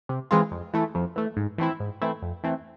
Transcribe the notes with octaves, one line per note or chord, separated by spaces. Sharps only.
C3
E3 G#3 C4 F4
F2
E3 A3
F2
E3 A3
G#2
E3 A3 C4 E4
G#2
E3 A3 C4 E4
F2
E3 A3 C4